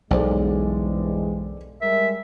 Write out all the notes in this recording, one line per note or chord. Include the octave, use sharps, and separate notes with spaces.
B1 E2 G2 G#3 A4 C5 D5
G3 G#3 A#4 E5